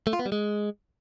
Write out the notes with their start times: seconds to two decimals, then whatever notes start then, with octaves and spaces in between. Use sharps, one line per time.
0.07 A3
0.13 F4
0.19 B3
0.26 G3
0.32 G#3